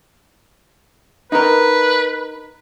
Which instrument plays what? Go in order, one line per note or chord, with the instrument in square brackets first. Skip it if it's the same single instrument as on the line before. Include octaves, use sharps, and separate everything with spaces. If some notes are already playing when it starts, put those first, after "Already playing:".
[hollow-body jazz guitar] D#4 A#4 [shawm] B4